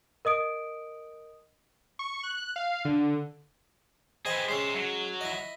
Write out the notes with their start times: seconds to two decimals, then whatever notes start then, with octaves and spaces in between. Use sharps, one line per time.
0.25 A#4 D#5 D#6 D7
1.99 C#6
2.23 F#6
2.56 F5
2.85 D3
4.25 G#4 B4 C5 D#5 G5
4.49 G#3 C#4 C5 E5
4.75 F#3
5.21 E4 D#5